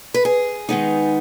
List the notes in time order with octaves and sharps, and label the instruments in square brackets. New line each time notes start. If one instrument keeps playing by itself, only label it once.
[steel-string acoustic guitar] B4
G#4
D#3 G#3 B3 D#4